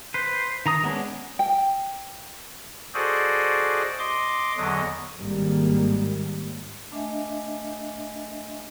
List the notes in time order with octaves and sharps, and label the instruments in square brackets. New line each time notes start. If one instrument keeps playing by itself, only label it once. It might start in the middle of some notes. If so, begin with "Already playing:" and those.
[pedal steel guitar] B4 C5
D#3 A#5 D#6
G#3 B3 C#4 D4
[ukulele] G5
[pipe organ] F#4 G#4 A4 C5 D5 D#5
D#5 C6 D6
E2 D3 F#3 D#5
[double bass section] G#1 G#2 D#3 G3 A#3
[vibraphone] A3 D4 D#5 E5 G#5